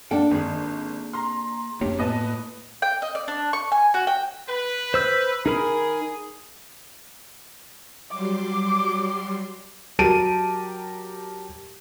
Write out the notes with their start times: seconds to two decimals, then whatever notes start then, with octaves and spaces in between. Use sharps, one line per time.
0.11 A#3 D4 A4 F#5 G5
0.31 G#1 A#3 G#4
1.13 A#5 C6
1.81 F2 A3 A#3 D4 G4 C#5
1.98 A2 A#3 B3 B4 D#5 G#5 A5
2.82 G5
3.02 D#5
3.15 D5
3.28 D4
3.53 C#6
3.72 G#5
3.94 F#4
4.07 G5
4.49 B4
4.94 C5 E6 G6
5.46 D#4 G#4 A#4 B5
8.11 F#3 G3 C6 D6
9.99 F#3 G4 A#4 A5 D7 D#7